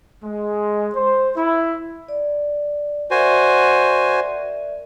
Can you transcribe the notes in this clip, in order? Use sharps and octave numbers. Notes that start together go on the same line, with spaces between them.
G#3
C5
E4
D5
F#4 A#4 C5 D5 E5 G#5